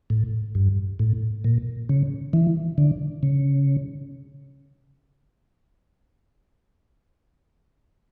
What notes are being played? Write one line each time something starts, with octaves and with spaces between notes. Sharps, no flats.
A2
G2
A2
A#2
C#3
E3
D3
C#3